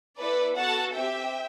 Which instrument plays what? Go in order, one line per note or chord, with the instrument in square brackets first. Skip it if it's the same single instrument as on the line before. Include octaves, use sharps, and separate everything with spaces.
[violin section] B3 E4 A4 B4 D5
B3 F#4 A4 F#5 A5
C4 G4 E5 G5